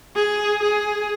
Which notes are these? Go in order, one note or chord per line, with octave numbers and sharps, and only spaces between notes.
G#4
G#4